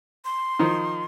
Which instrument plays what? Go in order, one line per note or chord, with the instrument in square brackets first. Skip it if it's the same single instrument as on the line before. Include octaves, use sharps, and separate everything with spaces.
[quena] C6
[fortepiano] D#3 F3